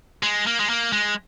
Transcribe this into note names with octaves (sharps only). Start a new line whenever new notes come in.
G#3
A#3
G#3
A#3
G#3